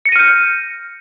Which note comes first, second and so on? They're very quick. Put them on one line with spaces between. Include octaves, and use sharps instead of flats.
C#7 A#6 D#7 F6 G6